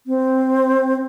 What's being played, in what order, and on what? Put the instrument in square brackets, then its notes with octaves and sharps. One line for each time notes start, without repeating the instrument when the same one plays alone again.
[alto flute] C4